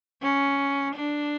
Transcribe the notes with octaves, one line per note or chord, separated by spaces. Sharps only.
C#4
D4